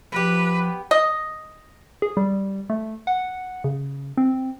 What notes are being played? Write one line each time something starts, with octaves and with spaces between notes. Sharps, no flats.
F3 B3 G4 B4
D#5
G#4
G3
A3
F#5
C#3
C4